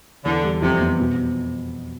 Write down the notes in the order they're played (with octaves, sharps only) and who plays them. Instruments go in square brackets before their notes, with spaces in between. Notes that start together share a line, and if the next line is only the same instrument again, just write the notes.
[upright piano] E2 [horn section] D3
[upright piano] G3
[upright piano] F2 [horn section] C3
[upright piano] B3
B2